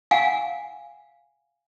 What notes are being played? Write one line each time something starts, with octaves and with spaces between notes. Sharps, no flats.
F5 F#5 G#5